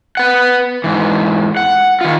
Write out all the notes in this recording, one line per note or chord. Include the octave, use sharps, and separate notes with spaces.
B4 F#5
G#2 E3
F#5
D#3 F4